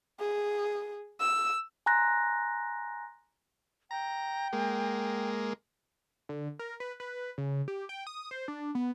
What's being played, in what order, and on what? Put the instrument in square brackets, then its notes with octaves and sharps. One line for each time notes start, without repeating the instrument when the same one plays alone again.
[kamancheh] G#4
E6
[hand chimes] G#5 A#5 C6 F#6 A#6
[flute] G5 [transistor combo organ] A#5
[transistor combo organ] G#3 A#3
[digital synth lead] D3
A#4
B4
B4
C#3
G4
G5
D#6
C5
D4
B3